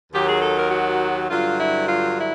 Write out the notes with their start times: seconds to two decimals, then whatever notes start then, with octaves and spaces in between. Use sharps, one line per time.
0.11 D#2 D#3 F#3 G4
0.25 G#4
0.40 A4
0.55 A#4
0.70 F#4
1.28 G2 D3 F#3 F4
1.58 E4
1.87 F4
2.16 E4